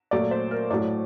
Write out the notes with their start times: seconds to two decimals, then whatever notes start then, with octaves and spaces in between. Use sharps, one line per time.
0.11 A#2 F#3 A3 D5
0.31 C5
0.51 A#4
0.71 A2 F#3 A3 D5